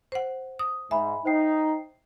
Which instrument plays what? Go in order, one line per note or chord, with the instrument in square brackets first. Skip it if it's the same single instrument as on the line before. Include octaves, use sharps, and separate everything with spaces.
[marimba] C5 F#5
D#6
[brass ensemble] G#2 [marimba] E5 [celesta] G#5 B5
[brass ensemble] D#4 [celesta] C5 G5 C7